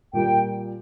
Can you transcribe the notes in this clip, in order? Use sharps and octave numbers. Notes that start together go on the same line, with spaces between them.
A#2 G3 A#3 F4 G5